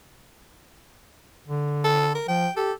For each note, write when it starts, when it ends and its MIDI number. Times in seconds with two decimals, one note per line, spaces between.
1.48 2.19 50
1.84 2.11 69
2.15 2.25 70
2.28 2.47 53
2.28 2.52 79
2.57 2.72 67
2.57 2.73 69